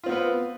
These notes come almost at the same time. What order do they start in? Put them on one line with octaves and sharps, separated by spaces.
F4 C4 B3 B4